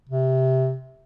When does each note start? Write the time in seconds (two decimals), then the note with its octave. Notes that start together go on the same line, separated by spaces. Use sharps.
0.09 C3